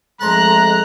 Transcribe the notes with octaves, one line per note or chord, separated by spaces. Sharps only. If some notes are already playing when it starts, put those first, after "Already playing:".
F2 G#3 A3 C5 A5 A#5 F#6